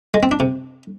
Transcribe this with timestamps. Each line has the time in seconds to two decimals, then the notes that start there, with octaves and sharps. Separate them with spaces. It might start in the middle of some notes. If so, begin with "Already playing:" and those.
0.14 G#3
0.23 C4
0.31 D4
0.40 C3